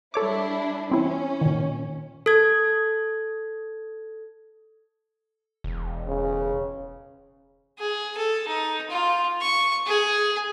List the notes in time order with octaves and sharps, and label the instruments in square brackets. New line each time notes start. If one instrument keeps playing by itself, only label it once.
[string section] G3 D4 E4 [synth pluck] A4 C#5 D6
[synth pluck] E3 C4 E4 [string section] C#4
[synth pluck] A#2 D#3
[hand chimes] A4 G#6
[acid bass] E1
[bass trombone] C#3
[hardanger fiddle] G#4
A4
D#4
F4
C#6
G#4